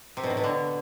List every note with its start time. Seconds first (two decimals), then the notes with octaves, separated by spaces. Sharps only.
0.17 C3
0.24 B2
0.30 A2
0.37 B2
0.44 D3